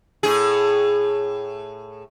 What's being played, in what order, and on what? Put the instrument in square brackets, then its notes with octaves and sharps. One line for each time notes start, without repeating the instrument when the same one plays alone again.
[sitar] A2 G#4